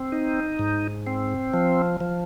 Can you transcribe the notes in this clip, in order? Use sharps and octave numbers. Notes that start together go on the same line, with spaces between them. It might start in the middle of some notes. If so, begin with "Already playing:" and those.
Already playing: C4
D#4
G#2
C4
F3
F3